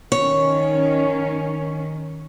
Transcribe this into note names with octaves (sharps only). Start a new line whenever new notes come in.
D#3 C#4 C#5